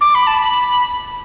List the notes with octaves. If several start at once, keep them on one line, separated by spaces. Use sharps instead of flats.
D6
B5
A5
B5